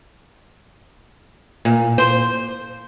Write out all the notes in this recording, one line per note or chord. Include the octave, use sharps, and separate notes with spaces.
A#2
C5